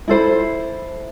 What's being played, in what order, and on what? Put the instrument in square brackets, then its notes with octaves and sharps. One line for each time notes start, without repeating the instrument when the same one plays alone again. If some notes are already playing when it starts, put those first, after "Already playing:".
[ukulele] E4 A4 C5 B5